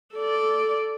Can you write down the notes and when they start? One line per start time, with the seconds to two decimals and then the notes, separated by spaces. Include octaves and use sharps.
0.14 A4 D5